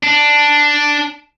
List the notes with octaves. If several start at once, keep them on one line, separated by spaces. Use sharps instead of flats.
D4